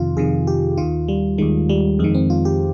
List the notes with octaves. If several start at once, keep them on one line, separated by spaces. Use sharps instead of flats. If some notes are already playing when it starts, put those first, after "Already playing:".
Already playing: F2 C3 D#3 F4
F2 C3 D#3 G#4
G4
D#2 D#3 F4
G3
D#2 D#3 G#3
G3
F2 D#3 G#3
C4
F4
G4